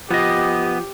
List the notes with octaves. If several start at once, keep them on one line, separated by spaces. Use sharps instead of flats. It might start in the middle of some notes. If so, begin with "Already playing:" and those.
F3 B3 G4 D#5